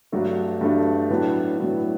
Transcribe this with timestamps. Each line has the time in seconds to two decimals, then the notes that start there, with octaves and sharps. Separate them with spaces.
0.12 G2 F#3 A3 D4
0.61 G2 F#3 A3 D4
1.09 A2 F#3 B3 D4
1.58 A2 F#3 B3 D4